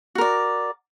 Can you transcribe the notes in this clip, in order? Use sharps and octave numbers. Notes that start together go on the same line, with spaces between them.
F#4 A#4 D5